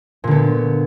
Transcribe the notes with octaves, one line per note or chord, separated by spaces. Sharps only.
A#2 D3 B3